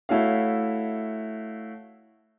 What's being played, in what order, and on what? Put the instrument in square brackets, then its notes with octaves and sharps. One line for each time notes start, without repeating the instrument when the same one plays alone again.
[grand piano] A3 E4 F#4 C#5 F5